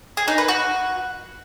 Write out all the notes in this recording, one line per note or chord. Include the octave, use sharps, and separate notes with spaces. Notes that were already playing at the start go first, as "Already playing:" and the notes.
G#4
D#4
B4
F#4